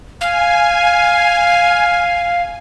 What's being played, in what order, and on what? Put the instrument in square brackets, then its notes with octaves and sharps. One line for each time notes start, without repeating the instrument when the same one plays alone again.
[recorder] F5 [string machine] G#5